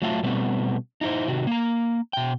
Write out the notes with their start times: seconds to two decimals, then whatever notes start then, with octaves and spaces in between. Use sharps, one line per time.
0.02 F#3 A3 F4 E5 F#5 A5
0.23 B2 G3 A3 B3 C4
1.01 D#4 E4 A4 C5
1.28 C3 D#3 F#4
1.47 A#3 A#5
2.13 B2 G5